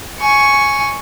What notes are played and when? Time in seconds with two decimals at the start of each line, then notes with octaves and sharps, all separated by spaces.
0.20 G#5 C#6